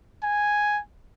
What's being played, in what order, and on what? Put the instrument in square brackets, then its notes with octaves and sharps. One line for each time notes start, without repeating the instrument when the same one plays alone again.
[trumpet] G#5